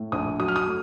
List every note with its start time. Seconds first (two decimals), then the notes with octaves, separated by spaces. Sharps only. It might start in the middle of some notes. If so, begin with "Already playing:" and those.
Already playing: A2
0.12 A#1 D#6
0.40 F#3 D#6
0.48 F6
0.56 D#6
0.67 A3